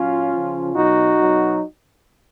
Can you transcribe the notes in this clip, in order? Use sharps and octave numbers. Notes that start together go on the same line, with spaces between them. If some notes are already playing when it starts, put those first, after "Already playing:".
Already playing: A#2 F#3 C#4 F4
C#3 F3
B2 F#3 D#4 F#4
B2 F#3